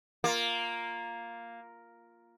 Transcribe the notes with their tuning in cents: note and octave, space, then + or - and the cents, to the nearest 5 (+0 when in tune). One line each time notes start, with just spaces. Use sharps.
A#3 +0 F4 +0